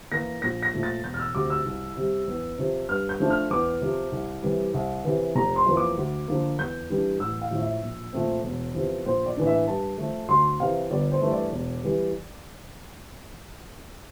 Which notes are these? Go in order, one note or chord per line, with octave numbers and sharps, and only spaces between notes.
E3 A#3 A#6
A#1 A#6
A#6
A#2 F3 A3
A6
E1 G6
F6
E6
D2 C3 D6
E6
C2
C3 G3
E2
C3 F3
G2 F6
G6
F3 A3 D4
F6
E2 D6
C3 F3
C2
C3 E3 G3
C2
C3 E3
F1 A#5
C6
F2 E3 A#3
D6
D2
D3 F3 A#3
E2 G6
E3 G3 D4
A1 E6
F5
A2 F3
E5
A#1
A#2 F3 A3 C4
E1
E2 C3 F3
A#1 C5
D5
A2 E3 A#3 D4
E5
G2 A5
F3 A3
D2 C6
C3 E3 F5
G1 D5
C5
G2 E3 A3
D5
E1
E3 G3